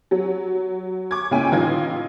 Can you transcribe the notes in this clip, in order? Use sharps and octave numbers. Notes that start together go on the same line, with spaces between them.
F#3
C#6 D6 G#6
C#2 A#3 C#4 E4 G5 G#5
A1 D#4 F4 G#6